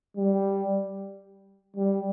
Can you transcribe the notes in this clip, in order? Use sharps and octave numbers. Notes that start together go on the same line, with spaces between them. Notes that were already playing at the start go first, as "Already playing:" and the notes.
G3
G3